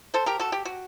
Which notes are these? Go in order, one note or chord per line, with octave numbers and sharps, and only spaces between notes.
A4 C5
G4 A#4
F#4 A4
G4
F#4